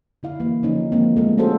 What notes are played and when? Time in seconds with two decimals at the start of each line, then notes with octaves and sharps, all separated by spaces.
0.23 D3 E4 F5
0.40 E3 A#3
0.63 D3 F3 C#4 D#4
0.92 D#3 F3 G#3 A#3 C4
1.17 G#3 A3
1.38 C#4 F4 F#4 G#4 A4 C5